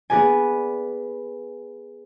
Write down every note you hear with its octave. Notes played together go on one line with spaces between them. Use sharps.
B3 G#4 B4 D5 G#5